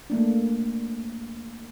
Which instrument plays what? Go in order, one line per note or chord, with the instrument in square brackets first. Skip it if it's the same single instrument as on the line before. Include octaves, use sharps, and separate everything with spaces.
[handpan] A3 A#3 D4